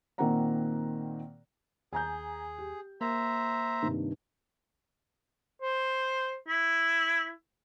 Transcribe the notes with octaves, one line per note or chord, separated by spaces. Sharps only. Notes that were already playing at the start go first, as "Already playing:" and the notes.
A#2 D#3 A#3 C4 F#5 A#5
D#2 G#4 G#5 A#5 G6
G4
A#3 C5 E5 A#5
G2 C3 D#3
C5
E4